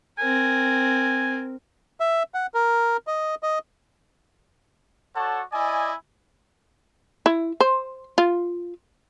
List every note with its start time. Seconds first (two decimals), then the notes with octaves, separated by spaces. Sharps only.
0.19 C4 A#4 G#5
2.00 E5
2.34 F#5
2.54 A#4
3.07 D#5
3.43 D#5
5.15 F#4 A4 C#5 D5 F#5 A5
5.53 E4 D5 D#5 G#5
7.26 E4
7.60 C5
8.18 F4